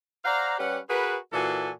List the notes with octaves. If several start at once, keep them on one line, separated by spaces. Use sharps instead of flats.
C5 D5 F5 F#5 A#5
G3 C#4 G4 B4 F#5
F#4 G#4 A#4 B4
A#2 E3 A#3 F#4 A4 G#5